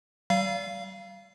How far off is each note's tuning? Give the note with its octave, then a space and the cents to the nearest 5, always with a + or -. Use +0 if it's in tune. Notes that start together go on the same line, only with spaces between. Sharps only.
G3 -35 F5 -15